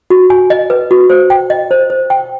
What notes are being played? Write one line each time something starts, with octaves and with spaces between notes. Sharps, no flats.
F#4
G#5
D#5
B4
F#4
C5
G5
D#5
C5
C5
G5